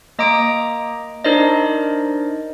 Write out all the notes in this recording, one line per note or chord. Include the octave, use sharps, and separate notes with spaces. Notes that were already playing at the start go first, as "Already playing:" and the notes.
A#3 D#5 A#5 D6 D#6 D7
D4 D#4 A#4 C5 D5 D#5